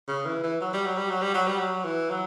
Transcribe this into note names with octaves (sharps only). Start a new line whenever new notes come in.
C#3
E3
E3
F#3
G3
F#3
G3
F#3
G3
F#3
G3
F#3
E3
F#3